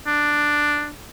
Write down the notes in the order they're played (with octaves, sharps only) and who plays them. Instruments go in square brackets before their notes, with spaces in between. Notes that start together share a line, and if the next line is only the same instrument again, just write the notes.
[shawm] D4